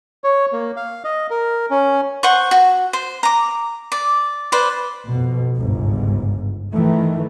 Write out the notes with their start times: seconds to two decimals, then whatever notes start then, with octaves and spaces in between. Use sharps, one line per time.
0.24 C#5
0.53 A#3
0.76 F5
1.04 D#5
1.30 A#4
1.70 C#4
2.23 C5 F#5 C#6
2.51 F#4
2.93 C5
3.23 A#5 D6
3.92 D5
4.52 B4 C5 D5
5.08 F2 B2
5.57 G1 C#2 G#2
6.73 D#3 E3 A3